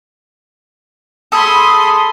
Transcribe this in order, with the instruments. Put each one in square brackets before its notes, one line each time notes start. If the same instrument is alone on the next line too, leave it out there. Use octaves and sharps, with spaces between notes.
[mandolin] G#4 A4 [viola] B5 C6 [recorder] D#6